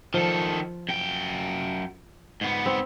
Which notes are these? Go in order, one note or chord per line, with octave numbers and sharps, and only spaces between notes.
D#3 F3 A4
F#2 G5
G#2 B3
C4